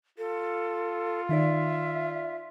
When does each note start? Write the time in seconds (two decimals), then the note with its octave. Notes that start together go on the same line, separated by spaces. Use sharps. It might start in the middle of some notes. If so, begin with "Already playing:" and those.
0.18 F4 A4
1.29 D#3 D#4 D5 E5